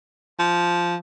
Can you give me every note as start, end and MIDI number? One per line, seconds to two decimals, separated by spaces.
0.40 0.96 53